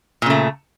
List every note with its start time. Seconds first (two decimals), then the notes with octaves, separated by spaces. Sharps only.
0.22 A#2
0.26 C#3
0.30 A3